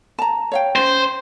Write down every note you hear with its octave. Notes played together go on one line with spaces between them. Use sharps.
A5 A#5
C#5 F5 G5
C#4 C5